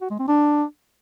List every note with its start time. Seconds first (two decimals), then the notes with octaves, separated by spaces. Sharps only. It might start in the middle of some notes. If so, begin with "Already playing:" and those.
0.01 F#4
0.10 G#3
0.19 C4
0.28 D4